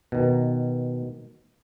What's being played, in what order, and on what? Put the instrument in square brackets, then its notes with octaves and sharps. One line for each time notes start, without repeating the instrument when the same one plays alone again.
[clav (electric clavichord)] B2 D#3